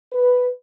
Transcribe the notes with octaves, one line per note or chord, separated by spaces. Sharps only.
B4